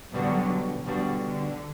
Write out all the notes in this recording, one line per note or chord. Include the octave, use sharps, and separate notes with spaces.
B2 D3 F#3 G3 D4 F#4
B2 D3 G3 D4 F#4
D3